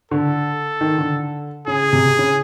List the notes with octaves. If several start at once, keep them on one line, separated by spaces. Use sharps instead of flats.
D3 A4
D#3
D3
C#3 G#4
C3
C#3